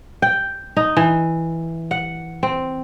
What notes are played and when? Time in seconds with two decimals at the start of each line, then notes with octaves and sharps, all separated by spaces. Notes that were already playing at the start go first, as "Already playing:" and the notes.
0.22 G5
0.77 D#4
0.97 E3
1.91 F#5
2.43 C4